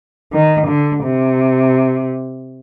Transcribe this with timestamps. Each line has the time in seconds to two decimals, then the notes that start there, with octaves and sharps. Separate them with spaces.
0.33 D#3
0.68 D3
1.04 C3